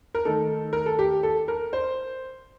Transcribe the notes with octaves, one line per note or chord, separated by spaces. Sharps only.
A#4
D#3 A3 D#4 A4
A#4
A4
G4
A4
A#4
C5